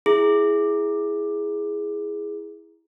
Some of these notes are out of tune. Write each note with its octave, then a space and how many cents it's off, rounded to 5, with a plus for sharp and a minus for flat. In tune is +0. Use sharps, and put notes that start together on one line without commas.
E4 +0 G#4 +0